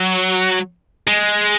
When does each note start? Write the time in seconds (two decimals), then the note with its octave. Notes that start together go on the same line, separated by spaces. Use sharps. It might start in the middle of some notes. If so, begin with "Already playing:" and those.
Already playing: F#3
1.07 G#3